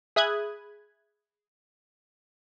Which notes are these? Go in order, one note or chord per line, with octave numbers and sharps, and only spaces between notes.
G#4 E5 B5 D#6 F#6 G#6